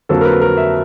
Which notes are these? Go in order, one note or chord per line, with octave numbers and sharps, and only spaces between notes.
F2 D3 F#3 A#3 A4
A#4
B4
A#4
E5